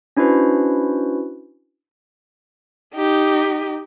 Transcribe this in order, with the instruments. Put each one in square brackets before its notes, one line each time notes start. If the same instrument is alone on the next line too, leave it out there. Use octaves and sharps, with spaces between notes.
[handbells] C#4 D4 E4 F#4 B4 C5
[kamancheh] D#4 G4